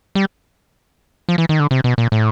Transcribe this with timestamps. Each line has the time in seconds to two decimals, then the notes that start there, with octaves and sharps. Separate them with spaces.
0.15 G3
1.29 F3
1.38 E3
1.49 D#3
1.60 D3
1.71 C3
1.84 B2
1.98 A#2
2.12 A2